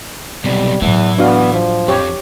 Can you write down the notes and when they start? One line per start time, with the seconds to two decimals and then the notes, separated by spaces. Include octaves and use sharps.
0.44 B1 C3 G3
0.82 E2 A2 E3 F#3
1.18 B3 D4 F#4 F5
1.53 F3
1.88 F2 G4 C#5